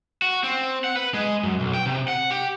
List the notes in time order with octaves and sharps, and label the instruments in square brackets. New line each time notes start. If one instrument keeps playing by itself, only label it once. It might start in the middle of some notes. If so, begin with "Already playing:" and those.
[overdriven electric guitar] F#4
C4
F#5
B4
G#3
F#2
B1
G5
C3
F#5
G4